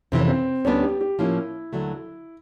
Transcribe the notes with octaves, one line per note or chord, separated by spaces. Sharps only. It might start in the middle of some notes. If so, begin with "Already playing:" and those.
F2 C3 E3 C4
C#4
C4
D2 D3 G3 B3 C#4 D4
G4
G4
A2 F3 A#3 C#4 E4
D#2 D3 F#3 A3